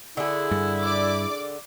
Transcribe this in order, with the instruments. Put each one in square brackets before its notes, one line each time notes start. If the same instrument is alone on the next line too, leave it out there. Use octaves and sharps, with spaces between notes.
[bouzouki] D3 G#4 [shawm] E4
[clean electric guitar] G2
[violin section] D5 D6